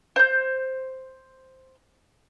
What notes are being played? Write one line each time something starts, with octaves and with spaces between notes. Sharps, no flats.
C5 G6